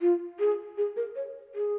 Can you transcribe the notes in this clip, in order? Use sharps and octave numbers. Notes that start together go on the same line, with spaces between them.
F4
G#4
G#4
A#4
C#5
G#4